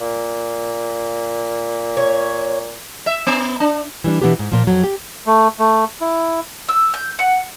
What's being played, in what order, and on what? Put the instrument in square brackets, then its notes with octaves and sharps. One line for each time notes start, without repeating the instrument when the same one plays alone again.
[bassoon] A#2
[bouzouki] C#5
[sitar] E5
B3
D4
[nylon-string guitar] E3 G3 D4
B2 E3 A#3 B3 D4 G4
G#2
A#2 F3
F2 F#3
G4
[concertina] A3
A3
E4
[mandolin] E6
G6
F#5